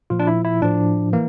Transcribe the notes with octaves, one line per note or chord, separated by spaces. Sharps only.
A#2 F3 F4
D4
E4
E4
A2 F3 D4
E3 A#3